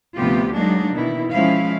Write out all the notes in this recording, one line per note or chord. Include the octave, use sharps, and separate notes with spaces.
D2 C3 F3 B3 F4 G4
F#3 G#3 A#3 D4 D#4
B2 D#3 E3 E4
F3 G#3 C#4 E4 F5